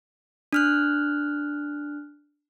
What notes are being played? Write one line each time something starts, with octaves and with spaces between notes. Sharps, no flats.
D4 F6 F#6